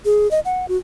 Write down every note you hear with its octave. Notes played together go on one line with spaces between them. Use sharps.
G#4
D#5
F#5
F#4